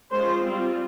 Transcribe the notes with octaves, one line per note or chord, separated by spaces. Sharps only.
G#3 C#4 F4 C5
G3 C4 F4